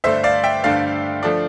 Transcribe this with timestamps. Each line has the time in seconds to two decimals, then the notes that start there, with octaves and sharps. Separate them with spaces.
0.04 G2 D3 A3 D4 C5 E5
0.24 D5 F5
0.44 E5 G5
0.64 G2 D3 A3 D4 D5 F5
1.23 D3 F3 A3 D4